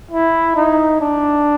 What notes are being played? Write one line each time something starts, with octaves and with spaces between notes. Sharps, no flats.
E4
D#4
D4